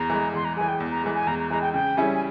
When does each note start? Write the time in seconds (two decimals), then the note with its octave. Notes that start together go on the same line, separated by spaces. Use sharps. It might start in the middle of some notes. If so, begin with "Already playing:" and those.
Already playing: E2 A#5
0.10 E3 G#3
0.33 E2 C6
0.45 A#5
0.57 E3 G#3 G#5
0.68 G5
0.80 E2
0.92 A#5
1.04 E3 G#3
1.15 G#5
1.27 E2 A#5
1.39 A#5
1.50 E3 G#3 A#5
1.62 G5
1.74 C#3 G5
1.97 G3 C#4 E4 G#4 G#5
2.15 G#5